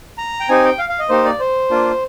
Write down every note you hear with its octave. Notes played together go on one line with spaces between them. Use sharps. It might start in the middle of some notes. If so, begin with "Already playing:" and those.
A#5
G5
C4 D#4 G4 G#5
G5
F5
F5
D#5
A#3 D#4 G4 C5
D5
C5
A#3 D4 F4